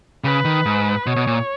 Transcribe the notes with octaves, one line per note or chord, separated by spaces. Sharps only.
C#3 B4
D#3
G#2
B2 C#5
B2
A#2